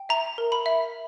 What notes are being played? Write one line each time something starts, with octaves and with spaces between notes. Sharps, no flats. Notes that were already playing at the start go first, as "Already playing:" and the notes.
Already playing: G5
E5 A#5
A#4
B5
E5